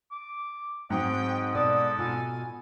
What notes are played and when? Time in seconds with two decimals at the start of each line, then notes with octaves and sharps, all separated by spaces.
0.11 D6
0.90 G#2 F#3 G#3 C4 D#5 G5
1.55 B2 A4 D5 D#6
1.99 B2 F4 G#5